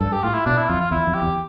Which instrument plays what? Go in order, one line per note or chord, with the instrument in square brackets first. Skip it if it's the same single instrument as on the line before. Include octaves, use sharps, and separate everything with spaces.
[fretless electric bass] G2 [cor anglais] A4
[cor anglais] G4
[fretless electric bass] A2 [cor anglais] F4
[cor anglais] E4
[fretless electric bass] B2 [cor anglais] D4
[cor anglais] E4
[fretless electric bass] F2 [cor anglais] F4
[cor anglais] F4
[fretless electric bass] E2 [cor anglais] E4
[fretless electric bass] F2
[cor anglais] G4
[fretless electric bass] E2